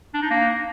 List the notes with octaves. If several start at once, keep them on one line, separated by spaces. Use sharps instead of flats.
D4
D#4
A#3